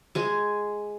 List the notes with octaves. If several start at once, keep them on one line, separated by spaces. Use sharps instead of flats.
G#3 G#4